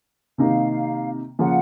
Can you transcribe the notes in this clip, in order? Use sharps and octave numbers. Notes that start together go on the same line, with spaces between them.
C3 D#3 A#3 D#4 F5
C#3 F3 A#3 F4 F#5